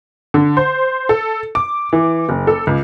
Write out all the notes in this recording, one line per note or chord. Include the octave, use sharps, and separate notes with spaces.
D3
C5
A4
D6
E3
F#1
A4
C#2